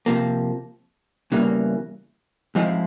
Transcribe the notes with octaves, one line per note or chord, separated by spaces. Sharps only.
C3 F3 A#3
E2 C#3 E3 G3 A#3
G#2 F3 G#3 C4 E4